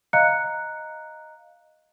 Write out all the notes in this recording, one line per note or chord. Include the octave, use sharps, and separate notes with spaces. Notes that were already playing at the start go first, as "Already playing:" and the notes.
D#5 F5 A#5 F#6 C#7